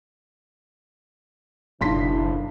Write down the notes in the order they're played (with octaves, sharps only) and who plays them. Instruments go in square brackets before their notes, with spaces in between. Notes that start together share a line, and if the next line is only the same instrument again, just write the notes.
[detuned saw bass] F#1 [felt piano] B1 C6 B6 [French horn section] D3 D4 E4